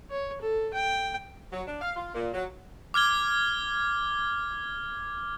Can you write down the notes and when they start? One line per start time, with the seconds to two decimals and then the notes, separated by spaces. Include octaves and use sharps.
0.11 C#5
0.42 A4
0.74 G5
1.52 F#3
1.67 D4
1.82 F5
1.96 F4
2.14 A#2
2.34 F#3
2.94 D6 F6 G#6 G7